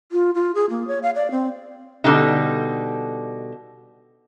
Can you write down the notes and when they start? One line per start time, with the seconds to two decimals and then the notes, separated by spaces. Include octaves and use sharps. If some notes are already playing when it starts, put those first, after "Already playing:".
0.12 F4
0.35 F4
0.55 G#4
0.70 A#3
0.87 C#5
1.03 F5
1.15 D5
1.31 C4
2.04 B2 D3 G3 D#4